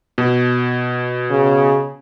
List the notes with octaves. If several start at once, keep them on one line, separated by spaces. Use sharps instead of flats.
B2
C#3